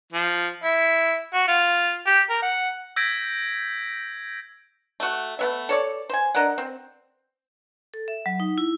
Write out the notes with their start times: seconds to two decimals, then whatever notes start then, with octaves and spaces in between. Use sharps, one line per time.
0.12 F3
0.64 E4
1.34 F#4
1.48 F4
2.06 G4
2.30 A#4
2.42 F#5
2.96 E6 G6 G#6 A#6 B6 D7
5.00 A3 F#4
5.39 A3 B3 E5
5.69 A4 C#5 D5
6.10 C5 G#5
6.35 D4 A#4 D#5 F#5
6.58 C4
7.94 A4
8.08 E5
8.26 F#3
8.40 D#4
8.58 E4